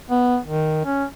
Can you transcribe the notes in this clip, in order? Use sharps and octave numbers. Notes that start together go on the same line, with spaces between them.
B3
D#3
C#4